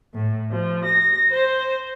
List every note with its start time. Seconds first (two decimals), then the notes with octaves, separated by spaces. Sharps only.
0.14 A2
0.51 F3
0.84 A#6
1.30 C5